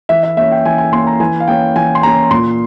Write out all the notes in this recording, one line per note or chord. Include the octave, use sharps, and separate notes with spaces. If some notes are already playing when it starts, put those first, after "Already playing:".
E3 E5
E5
A#3 C#4 E5
G5
E3 G#5
G#5
A#3 C#4 C6
A#5
E3 G#5
F5
A#3 C#4 G5
E3 G#5
C6
A#3 C#4 A#5
A#2 C6